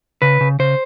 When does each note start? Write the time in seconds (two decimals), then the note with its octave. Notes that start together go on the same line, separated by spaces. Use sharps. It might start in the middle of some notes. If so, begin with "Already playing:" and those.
0.22 C#3 B4
0.41 C#3
0.59 C#3 C5